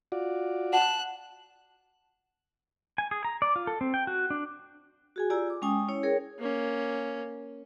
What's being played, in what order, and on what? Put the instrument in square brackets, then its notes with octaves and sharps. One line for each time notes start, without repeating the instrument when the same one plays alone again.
[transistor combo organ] F4 F#4 D5
[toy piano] F#5 [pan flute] A5 [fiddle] F#6
[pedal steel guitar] G#5
G#4
A#5
D5
F4
A4
C4
G5
F#4
D4
[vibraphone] F#4 G#4 G#5
F4 G4 D5 G#5 A#5 E6
D6
G#3 C#4 G5 G#5 D#6
C#4 E4 C#5
G#4 A#4 C#5 G5
[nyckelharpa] A#3 C#4